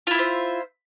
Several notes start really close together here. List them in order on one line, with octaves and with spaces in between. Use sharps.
F4 E4 E5 C5